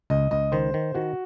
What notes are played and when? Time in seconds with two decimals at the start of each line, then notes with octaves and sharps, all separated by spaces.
0.10 C#2 D#5
0.31 C#2 D#5
0.52 D#3 C5
0.74 D#3
0.94 D#3 F#4